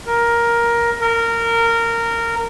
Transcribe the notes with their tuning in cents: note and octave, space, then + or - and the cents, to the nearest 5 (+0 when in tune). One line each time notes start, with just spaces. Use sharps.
A#4 +10
A#4 -15